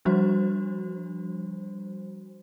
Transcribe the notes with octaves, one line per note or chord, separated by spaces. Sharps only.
F3 G3 D4 F#4 C5